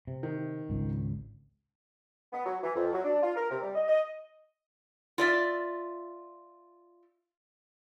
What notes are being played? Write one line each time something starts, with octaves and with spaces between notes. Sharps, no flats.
C3
D#3
G#1 C#2
B3
F#3
E3
F2
F#3
D4
F4
A#4
C3
G3
D#5
D#5
F4 D5 E5